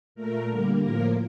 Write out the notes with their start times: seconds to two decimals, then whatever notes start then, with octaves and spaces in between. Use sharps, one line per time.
0.15 A#2 A3 A#4
0.49 D3 G3 A#3
0.81 A2 F3 A#3 A#4